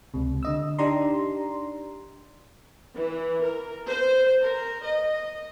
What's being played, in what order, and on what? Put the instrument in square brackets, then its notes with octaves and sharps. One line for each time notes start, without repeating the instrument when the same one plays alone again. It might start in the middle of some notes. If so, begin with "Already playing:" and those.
[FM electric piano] C#2 C3
D3 D#5 E6
D4 D#4 G4 D5 A#5 C6
[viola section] E3
A#4
C5
A#4
D#5